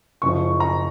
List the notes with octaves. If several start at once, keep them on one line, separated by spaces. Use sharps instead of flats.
F#1 F#2 F3 C#6
A#5